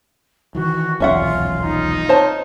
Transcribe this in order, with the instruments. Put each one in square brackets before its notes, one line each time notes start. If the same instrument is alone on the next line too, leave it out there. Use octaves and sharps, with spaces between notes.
[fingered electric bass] D#3 E3 [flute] F#4
[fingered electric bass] D#1 B1 E2 [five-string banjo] C#4 E5 F#5 [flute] F4
[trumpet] D#4
[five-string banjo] C5 C#5 A5